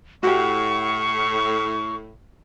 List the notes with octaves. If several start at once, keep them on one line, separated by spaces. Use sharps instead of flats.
A2 F#4 G4 C#6